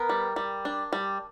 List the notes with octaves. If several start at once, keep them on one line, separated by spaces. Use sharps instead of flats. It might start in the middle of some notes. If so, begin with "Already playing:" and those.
Already playing: B3 A#4
G3
G3
D4
G3